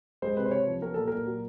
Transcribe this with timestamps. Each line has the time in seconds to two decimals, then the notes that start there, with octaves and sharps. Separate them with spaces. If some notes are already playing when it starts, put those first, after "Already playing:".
0.22 G#3 C5
0.37 C3 B4
0.46 C5
0.51 C3 C#5
0.67 F3
0.81 B3 A#4
0.94 A#2 A4
1.07 A#4
1.13 A#2
1.27 F#3